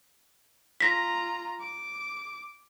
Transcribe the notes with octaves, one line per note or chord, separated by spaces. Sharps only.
F4 A#5 A#6 B6
D6